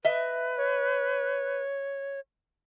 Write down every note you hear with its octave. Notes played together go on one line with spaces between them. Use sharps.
B4 D#5 E5
C#5